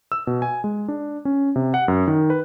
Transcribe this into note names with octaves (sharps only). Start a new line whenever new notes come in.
E6
B2
G#5
G#3
D4
C#4
C3
F#5
F#2
D#3
B4